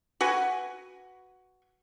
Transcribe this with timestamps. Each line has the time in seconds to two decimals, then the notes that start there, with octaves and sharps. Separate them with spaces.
0.21 F#4 B4 G#5